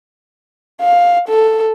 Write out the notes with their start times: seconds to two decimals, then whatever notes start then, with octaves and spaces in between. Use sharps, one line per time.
0.81 F5
1.28 A4